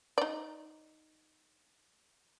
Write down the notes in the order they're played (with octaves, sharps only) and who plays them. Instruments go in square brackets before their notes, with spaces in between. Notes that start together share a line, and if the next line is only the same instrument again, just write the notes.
[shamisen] D#4 D5